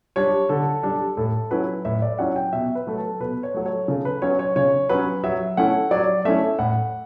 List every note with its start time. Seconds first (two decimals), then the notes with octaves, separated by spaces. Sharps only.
0.16 G3 D4 C#5
0.49 D3 A4
0.83 G3 D4
1.17 A2 A4
1.51 F#3 C#4 E4 B4
1.85 A2 E5
2.02 D5
2.19 F#3 C#4 E4 F#5
2.36 G5
2.53 B2 E5
2.75 B4
2.87 F#3 A3
2.98 A4
3.20 B2 B4
3.43 C#5
3.54 F#3 A3
3.66 C#5
3.88 C#3 A4
4.05 B4
4.22 F#3 C#4 C#5
4.39 C#5
4.56 C#3 C#5
4.89 F#3 C#4 B4
5.24 F#3 E5
5.57 A3 C#4 E4 F#5
5.91 F#3 D5
6.25 A3 C#4 E4 E5
6.59 A2 F#5